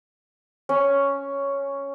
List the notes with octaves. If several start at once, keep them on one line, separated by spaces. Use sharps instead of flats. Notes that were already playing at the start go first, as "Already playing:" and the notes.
C#4